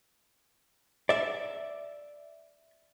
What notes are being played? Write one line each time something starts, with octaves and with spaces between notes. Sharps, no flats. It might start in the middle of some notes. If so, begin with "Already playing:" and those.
D5 E5